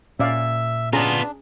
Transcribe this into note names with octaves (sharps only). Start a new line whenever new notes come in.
A#2 C#4 D5 E5 F5
B3 C#4 D4 F4 G#4 A#5